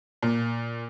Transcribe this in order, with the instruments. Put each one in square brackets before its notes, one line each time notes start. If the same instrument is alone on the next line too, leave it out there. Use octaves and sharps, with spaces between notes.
[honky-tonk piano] A#2